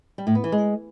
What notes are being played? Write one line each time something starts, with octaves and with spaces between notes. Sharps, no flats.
G3
A2
B3
E3
G#3